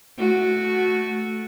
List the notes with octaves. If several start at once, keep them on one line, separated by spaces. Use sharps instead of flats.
A3 F#4